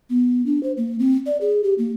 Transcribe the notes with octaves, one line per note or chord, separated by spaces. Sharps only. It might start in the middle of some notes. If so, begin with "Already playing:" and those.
B3
D4
C5
A#3
C4
D5
G#4
G4
A#3